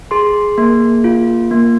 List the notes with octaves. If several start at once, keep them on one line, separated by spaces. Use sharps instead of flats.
G#4 C6
A#3
F4
A#3